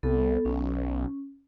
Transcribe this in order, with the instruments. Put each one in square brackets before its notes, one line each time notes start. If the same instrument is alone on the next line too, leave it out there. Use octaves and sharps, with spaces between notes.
[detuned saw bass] C2 [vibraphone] B3 A4
[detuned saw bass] B1 [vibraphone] C#4